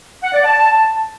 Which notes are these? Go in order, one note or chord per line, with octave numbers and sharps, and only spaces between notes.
F#5
D5
A5